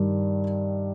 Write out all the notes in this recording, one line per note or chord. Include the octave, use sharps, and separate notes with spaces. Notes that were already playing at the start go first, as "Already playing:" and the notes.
Already playing: G2 D#3 G3